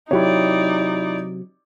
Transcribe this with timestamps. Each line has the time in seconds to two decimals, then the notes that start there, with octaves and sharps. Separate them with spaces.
0.11 C3 F#3 D#4 E4 G4 C#5 D5